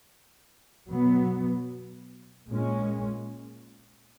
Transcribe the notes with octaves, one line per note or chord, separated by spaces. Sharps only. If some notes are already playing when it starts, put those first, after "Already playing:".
B2 F#3 B3
A#2 G#3 C#4